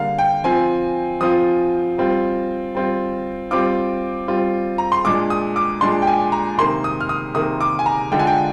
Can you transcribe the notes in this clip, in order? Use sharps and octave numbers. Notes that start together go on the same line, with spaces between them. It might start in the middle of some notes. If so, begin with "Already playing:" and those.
Already playing: D3 G3 A#3 F5
G5
F3 C4 F4 G#5
F3 C4 F4 D#6
G3 C4 F4
G3 C4 F4
G3 C4 F4 D6
G3 C4 F4
A#5
C6
A#2 G#3 D4 D6
D#6
D6
A#2 G#3 D4 C6
G5
G#5
A#5
C3 D#3 A#3 C6
D#6
F6
D#6
C3 D#3 A#3 D#6
D6
G#5
A#5
D3 G#3 D4 F4 G5
G#5
G5